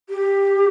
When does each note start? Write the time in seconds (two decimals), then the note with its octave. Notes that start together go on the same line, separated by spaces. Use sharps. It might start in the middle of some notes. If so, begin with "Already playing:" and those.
0.09 G4